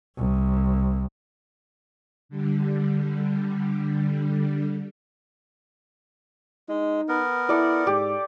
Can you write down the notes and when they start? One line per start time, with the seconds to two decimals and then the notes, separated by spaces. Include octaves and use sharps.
0.16 C2
2.29 D3 G3
6.69 G#3 D#4
7.09 B3 A#4
7.49 E4 A4 D5
7.87 G#2 G4